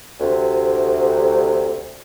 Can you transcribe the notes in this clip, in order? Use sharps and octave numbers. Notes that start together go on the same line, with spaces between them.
D2 C3